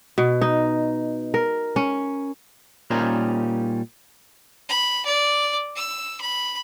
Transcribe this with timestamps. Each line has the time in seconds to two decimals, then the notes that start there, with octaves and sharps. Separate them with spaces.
0.18 B2
0.41 D#4
1.34 A#4
1.76 C#4
2.90 A#2 G3 C#4 D#4 A#4 C5
4.69 B5
5.06 D5
5.76 E6
6.21 B5